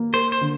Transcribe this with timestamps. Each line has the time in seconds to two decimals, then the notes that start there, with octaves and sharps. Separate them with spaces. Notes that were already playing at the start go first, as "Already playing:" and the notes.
Already playing: A#3
0.13 A#4 C5
0.32 C5
0.41 D3